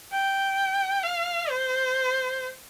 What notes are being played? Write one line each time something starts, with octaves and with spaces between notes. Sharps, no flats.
G5
F5
C5